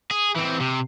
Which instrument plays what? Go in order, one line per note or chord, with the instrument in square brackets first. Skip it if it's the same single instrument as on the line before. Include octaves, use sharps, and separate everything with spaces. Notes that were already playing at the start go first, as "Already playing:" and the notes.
[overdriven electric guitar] G#4
E3 C4
C3